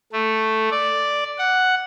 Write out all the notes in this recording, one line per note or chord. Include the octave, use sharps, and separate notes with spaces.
A3
D5
F#5